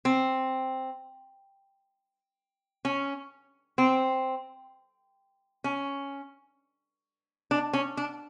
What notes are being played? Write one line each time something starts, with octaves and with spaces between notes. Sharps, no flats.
C4
C#4
C4
C#4
D4
C#4
D4